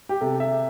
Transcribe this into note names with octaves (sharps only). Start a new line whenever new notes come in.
G4
C3 A4
E5